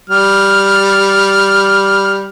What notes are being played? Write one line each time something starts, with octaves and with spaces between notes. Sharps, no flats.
G3 F6